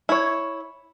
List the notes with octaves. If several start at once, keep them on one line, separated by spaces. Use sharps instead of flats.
E4 C#5